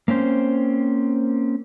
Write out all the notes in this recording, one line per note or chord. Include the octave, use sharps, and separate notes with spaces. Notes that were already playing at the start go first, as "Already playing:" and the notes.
A#3 C4 C#4 C5